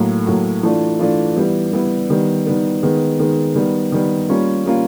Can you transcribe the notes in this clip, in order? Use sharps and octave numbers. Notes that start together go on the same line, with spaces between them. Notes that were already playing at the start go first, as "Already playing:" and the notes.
Already playing: A2 F#3 A#3
A2 F#3 A#3
E3 A3 D4 F4
E3 A3 D4 F4
E3 G3 B3 E4
E3 G3 B3 E4
D#3 G3 B3
D#3 G3 B3
D#3 G#3 B3
D#3 G#3 B3
D#3 G3 B3
D#3 G3 B3
G3 A#3 C#4 F4
G3 A#3 C#4 F4